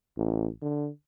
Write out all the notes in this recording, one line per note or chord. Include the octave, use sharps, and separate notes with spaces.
A1
D3